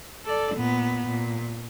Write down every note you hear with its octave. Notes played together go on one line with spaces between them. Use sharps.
A4 D5
A#2 B3
A#2